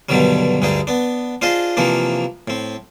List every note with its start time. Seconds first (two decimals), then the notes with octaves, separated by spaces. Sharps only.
0.09 G2 B2 D3 D#3 F#3 G3
0.62 D2 G2 D3 D#4 G#4
0.87 B3 D4
1.42 D4 F4 G#4 C5 D#5
1.77 C3 E3 F3 A#3 D4
2.48 A2 C4